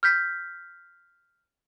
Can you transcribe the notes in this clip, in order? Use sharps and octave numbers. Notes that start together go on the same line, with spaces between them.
F6 G6 B6